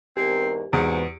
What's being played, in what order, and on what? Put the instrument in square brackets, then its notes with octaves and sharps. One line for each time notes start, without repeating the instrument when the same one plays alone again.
[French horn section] E2 G#2 A#4 [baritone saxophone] C4 [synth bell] G4
[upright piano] E2 [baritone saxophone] G#2 [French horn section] C3 F#4 B4 [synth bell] C#7 D7